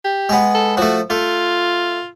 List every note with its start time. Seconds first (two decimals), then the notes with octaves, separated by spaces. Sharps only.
0.04 G4
0.29 G#3 B3
0.54 A4
0.77 F3 A3 F#4
1.10 A3 F4